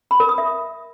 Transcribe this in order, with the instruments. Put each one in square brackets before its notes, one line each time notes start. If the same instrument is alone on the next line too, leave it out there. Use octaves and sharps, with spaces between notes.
[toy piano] B5
A#4
D#6
E5